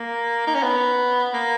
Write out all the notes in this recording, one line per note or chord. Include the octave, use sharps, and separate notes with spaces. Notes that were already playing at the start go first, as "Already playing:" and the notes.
Already playing: A#3
D#4
C#4
B3
A#3